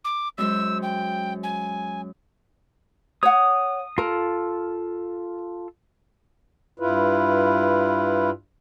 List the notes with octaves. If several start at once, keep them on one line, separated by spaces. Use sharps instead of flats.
D6
F#2 G#3 C5 E6
G5
G#5
C#5 F#5 D#6
F4 A4 A#4
G2 E4 F4 B4